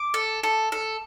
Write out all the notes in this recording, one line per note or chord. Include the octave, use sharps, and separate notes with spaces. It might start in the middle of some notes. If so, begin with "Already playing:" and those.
Already playing: D6
A4
A4
A4